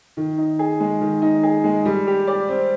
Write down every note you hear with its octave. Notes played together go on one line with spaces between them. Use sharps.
D#3
D#4
G#4
G#3
D#3
D#4
G#4
G#3
G3
G4
D5
C4